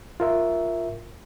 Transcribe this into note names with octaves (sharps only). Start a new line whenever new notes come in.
F4 A#4 E5